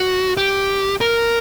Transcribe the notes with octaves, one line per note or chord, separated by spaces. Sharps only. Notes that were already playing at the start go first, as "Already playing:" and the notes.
Already playing: F#4
G4
A#4